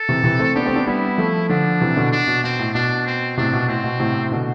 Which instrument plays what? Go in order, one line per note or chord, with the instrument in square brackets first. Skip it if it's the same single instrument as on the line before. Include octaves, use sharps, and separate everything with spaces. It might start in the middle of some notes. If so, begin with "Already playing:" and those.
Already playing: [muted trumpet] A4
[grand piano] C3 E3
C3 E3
A3 C4
[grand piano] B3 D4 [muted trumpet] G4
[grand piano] A3 C4
B3 D4
[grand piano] G3 B3 [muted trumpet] E4
[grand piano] F3 A3
[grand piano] D3 F3 [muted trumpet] D4
[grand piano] C3 E3
B2 D3
[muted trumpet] D4
[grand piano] B2
[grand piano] B2 [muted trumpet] C4
[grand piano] A2
[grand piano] B2 [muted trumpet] D4
[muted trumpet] C4
[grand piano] A2 C3 [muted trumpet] D4
[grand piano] B2
[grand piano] A2 [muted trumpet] C4
[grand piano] B2
A2 C3
B2 D3